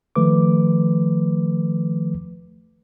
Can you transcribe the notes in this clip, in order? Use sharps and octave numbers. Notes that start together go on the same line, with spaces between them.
D#3 F3 A3 B4 D6